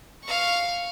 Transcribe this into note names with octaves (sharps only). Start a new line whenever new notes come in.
F5 C#6